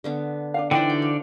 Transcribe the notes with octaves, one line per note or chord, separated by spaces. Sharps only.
D3 B3 D4
D4 F#4 F5
D3 E3 D4 D#4 C5 D5 G5
F#4 G5
F5